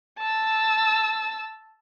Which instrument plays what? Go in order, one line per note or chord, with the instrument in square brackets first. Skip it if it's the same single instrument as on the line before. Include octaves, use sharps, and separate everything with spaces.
[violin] A5 E6